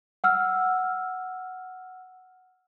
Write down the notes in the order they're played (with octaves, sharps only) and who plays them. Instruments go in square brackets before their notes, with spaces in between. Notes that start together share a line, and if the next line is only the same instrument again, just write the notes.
[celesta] F#5 E6 F6